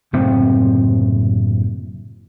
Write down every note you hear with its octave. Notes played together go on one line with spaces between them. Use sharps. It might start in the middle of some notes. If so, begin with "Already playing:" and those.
F#1 A2 C3 C4